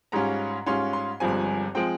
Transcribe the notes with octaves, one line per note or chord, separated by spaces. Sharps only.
G#2 G3 C#4 F4 A#5
G#2 G3 C#4 F4 C6
C6
G1 G2 F3 G#3 C4 G#5
F3 G#3 C4 G5